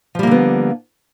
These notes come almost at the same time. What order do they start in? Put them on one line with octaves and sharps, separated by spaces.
F3 G3 A#3 D3 B3